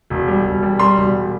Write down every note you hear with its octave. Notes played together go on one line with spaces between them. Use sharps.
E1
G3
E1
G3
G3 C6
E1